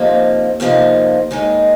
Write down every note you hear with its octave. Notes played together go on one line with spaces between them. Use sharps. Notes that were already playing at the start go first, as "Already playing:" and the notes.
Already playing: F2 C3 F3 A#3 D#4
F2 C3 F3 A#3 D#4
D#2 D#3 G#3 D#4